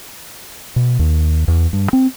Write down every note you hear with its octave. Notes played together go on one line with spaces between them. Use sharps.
B2
D#2
E2
G2
C4